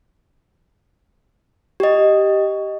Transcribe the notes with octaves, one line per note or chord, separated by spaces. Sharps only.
G4 D#5